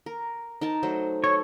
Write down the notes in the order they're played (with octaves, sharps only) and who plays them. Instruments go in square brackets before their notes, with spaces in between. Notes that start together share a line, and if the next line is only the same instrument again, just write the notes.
[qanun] A#4
D#4 A#4 A5
F#3 A3 C5
[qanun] A4 [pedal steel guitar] C#5